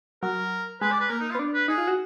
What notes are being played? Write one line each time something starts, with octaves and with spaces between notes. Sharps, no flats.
F#3 A#4
G#3 B4
D5
B4
A#3 A#4
D#4
F4
B3
D4
B4
D#4 G#4
F4
F#4